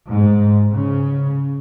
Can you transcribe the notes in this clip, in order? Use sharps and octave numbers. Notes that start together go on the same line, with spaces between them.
G#2
C#3